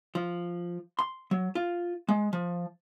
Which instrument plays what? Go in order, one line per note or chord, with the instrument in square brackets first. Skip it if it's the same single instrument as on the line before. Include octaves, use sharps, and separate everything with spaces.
[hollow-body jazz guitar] F3
C6
F#3
F4
G#3
F3